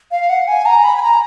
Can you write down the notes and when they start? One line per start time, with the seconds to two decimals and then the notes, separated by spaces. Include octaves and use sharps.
0.11 F5
0.29 F#5
0.48 G#5
0.66 A#5
0.84 B5
0.97 G#5
1.02 A#5